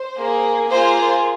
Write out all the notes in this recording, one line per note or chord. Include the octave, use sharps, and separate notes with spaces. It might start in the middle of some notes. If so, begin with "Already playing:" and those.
Already playing: C5
A#3 G#4
A#3 F4 G#4 C5